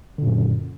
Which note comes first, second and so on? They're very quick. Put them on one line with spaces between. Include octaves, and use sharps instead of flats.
D3 A#2 F#2